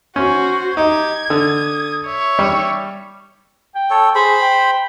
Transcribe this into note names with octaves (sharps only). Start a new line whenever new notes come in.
C#4 F#4 C5
D#4 G4 G#6
D3 D#6
C#5 E5
G3
G5
A4 C#5
G#4 C5 B5
G5